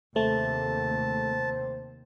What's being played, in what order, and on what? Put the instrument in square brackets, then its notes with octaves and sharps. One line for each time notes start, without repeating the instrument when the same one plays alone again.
[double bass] D#2 C3 [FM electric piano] A3 [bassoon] C5 [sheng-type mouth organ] A5